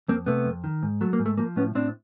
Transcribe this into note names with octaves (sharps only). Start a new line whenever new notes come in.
F2 A#3 C4
C3 A3 B3
F2
D#3
G#2
F#3 A3
A#3
G#2
A3
F3 A#3
A2 B3 C#4
A2 C4 D4